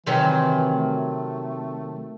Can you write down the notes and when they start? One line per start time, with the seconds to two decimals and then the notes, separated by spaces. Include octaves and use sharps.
0.06 C3 D#3 E3 F#3
0.72 A3